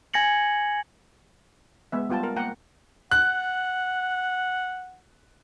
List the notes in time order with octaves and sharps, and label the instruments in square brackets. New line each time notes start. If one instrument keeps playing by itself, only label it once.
[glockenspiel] G#5 G#6 A#6 C#7 F#7
[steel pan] G#3 B3 E5
G3 B3 F4 G5 A5
A#4
A#3 F#5 G5 A#5
[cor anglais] F#5 [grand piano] F#6